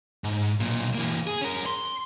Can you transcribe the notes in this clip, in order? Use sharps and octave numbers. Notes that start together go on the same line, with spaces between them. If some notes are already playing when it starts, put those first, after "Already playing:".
G#2
B1 A#2
E3 A#3
G#4
C#4 A#4
C6